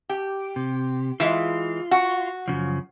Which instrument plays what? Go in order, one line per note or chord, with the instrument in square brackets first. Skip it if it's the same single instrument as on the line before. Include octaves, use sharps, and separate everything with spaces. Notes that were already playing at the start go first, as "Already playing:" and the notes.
[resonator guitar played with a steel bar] G4
[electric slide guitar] C3
[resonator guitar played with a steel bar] E3 G#3 [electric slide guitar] F4
[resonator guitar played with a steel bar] F#4
[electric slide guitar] F#2 C#3 F3